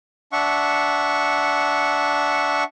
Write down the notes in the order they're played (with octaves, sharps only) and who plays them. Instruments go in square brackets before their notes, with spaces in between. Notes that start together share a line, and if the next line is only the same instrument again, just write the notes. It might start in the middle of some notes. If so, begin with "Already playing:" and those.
[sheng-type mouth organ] D4 E5 F#5 C#6